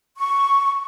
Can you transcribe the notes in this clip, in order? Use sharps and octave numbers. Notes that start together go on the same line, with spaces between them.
C#6